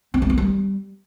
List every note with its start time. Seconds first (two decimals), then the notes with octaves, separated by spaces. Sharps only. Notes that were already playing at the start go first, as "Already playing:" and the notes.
0.14 C4
0.22 G#3
0.30 B3
0.38 G3